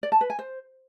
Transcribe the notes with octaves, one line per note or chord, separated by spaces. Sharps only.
D5
A5
B4
G#5
C5